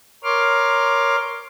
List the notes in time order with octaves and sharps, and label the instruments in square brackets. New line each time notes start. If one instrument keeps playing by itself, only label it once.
[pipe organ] A#4 C#5 C6 D6 F6